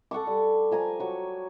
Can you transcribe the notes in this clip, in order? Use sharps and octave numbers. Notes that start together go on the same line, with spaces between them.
A4 F#5 C#6 D6
G3
F3 G#5 A#5 D6
F#3 C#6